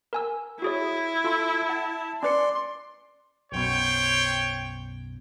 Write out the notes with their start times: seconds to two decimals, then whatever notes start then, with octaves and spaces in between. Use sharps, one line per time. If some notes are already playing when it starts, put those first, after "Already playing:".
0.13 A#4 G#5 E6
0.62 E4 F#4 G#4 C#5
1.24 F4 A4 C6
1.69 F#5 A5
2.23 C#4 B4 D5 C6 C#7
3.52 B1 F#2 B2 C5 C#5 G5